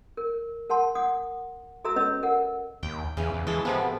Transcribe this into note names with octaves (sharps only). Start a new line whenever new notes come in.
A#4
A#4 F#5 A5 C6
F#5 D#6
F#4 A4 E5 A#5 E6
C#4 B4 C#5 D#5 E6
A#4 F#5
D#2 G5
E2 C#3 E3
E2
E3 G#3 A4
A2 C3 F3 B3